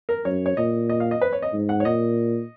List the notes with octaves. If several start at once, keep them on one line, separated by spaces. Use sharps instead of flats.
A#4
F#2 C#5
C#5
A#2 D#5
D#5
F5
D#5
B4
C#5
D#5
G#2
F#5
C#5
A#2 D#5